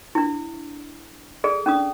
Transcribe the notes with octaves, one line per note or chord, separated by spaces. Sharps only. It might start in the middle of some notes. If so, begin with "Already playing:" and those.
D4 E4
G#4 A4 D5
C#4 D4 D#6